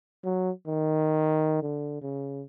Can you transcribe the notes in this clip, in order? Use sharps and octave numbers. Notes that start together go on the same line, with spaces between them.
F#3
D#3
D3
C#3